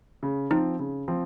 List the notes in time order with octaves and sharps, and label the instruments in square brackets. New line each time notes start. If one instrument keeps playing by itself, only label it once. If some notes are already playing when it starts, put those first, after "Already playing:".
[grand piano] C#3
[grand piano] F3 C4 [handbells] D#4
[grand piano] C#3
F3 C4